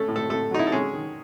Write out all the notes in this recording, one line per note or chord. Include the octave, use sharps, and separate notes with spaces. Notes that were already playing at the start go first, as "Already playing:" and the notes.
Already playing: A3 C#4 A4
A2
A3 A4
A2 A3 A4
F#3 D#4
E4
A4
G#3 C#4 G#4
D#3